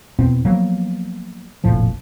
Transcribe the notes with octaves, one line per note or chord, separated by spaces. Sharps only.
E2 B2 B3 C4
F3 F#3 A#3 B3
F1 A#1 A2 F3